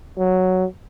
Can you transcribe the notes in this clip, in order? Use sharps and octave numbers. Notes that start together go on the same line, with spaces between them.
F#3